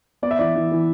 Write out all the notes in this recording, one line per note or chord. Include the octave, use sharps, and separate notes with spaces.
B3 D5
E5
E3 D5
E3
E3